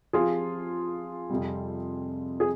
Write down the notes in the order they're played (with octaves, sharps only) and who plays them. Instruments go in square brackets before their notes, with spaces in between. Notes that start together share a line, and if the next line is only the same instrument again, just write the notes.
[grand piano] F3 C4 G4 [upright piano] F4 G#4
[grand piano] F2 C3 G3
[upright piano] G#4